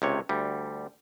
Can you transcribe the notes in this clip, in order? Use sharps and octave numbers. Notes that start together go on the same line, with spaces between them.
C#2 C3 C#5
D2 G3